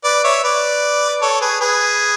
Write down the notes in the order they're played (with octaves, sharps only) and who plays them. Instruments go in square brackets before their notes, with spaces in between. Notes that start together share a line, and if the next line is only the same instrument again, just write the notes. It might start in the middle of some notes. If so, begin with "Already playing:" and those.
[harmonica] B4 D5
C#5 E5
B4 D5
A4 C#5
G#4 B4
G#4 B4